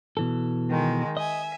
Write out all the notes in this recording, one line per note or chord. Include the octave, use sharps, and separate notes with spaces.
B2 E3 A4
D#3 G#3
D#5 E5 G#5